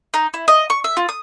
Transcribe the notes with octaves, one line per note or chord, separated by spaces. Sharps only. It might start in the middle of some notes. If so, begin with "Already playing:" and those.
D#4
E4
D#5
C#6
E5
F4
D#6